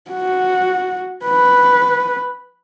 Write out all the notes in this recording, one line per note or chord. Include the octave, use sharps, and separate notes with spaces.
F#4
B4